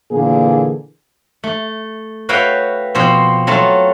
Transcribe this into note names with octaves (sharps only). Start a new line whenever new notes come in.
A#2 D3 E3 A#3 G#4
A3
F#4 B4 C#5 E5 F5 G5
B2 F3 C4
F#3 A3 F4 A5